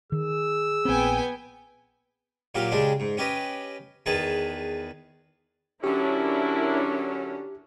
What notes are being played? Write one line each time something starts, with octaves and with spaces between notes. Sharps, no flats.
D#3 G#4 E6
A#1 B3 C4 G5 G#5
A#2 F#3 G4 F5
C#3 G#3 D4 G4
G#2
C#4 G4 B4 D#5
E2 D#3 G#4 B4 A5
D3 F#3 C#4 D4 E4 G4 A#4